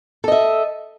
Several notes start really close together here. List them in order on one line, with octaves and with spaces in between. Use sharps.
A4 D#5 E5